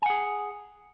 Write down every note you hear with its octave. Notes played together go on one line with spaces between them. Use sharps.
G#4 F#5 G#5